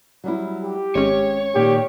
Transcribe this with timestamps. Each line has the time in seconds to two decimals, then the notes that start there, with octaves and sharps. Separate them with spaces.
0.24 F#3 G3 E4
0.64 G4
0.95 G#1 G#3 C4 C#4 C#5
1.55 A#2 D#3 G4